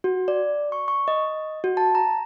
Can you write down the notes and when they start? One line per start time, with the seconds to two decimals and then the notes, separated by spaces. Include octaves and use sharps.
0.04 F#4
0.28 D5
0.72 C#6
0.88 C#6
1.08 D#5
1.64 F#4
1.77 A5
1.95 A#5